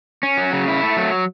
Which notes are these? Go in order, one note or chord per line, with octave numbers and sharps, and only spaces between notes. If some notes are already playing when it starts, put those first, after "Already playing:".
C#4
F#3
C#3
E4
A3
F#3